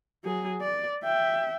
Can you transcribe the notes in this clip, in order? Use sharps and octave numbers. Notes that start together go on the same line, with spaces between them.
F#3 G#4
D5
E5 G5